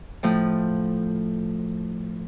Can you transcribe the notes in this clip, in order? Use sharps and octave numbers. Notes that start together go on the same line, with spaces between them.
A2 F3 A3